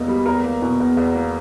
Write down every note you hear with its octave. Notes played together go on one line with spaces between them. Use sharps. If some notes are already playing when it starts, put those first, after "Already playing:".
Already playing: E2 B2 A#3 D#5
G3
E2 A#4
A#3
B2
E2
E2
A#3